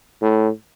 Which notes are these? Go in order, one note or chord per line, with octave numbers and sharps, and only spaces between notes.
A2